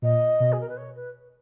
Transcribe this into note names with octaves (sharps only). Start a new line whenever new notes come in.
A#2 D#5
B2
G#4
A#4
B4
C#5
B4